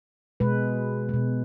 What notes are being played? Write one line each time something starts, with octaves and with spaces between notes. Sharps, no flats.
B2 G#3 B4
B2 G#3